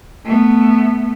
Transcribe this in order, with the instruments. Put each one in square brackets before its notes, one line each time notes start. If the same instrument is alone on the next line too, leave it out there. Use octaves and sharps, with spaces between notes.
[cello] A3 B3